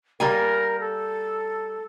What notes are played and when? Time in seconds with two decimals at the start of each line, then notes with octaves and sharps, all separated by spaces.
0.20 G3 A#3 A#4 G#5
0.80 A4